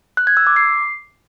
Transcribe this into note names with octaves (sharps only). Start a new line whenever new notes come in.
F#6
G#6
E6
D6
C7